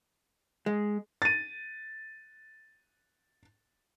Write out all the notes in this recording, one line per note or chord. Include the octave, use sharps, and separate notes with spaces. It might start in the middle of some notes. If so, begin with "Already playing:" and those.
G#3
A6 D#7